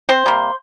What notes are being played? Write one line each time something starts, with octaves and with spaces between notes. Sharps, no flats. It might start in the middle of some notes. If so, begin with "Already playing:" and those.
C4 C5
C3 G3 A#3